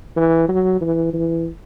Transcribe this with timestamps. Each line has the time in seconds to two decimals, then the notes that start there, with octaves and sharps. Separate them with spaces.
0.17 E3
0.49 F#3
0.81 E3
1.14 E3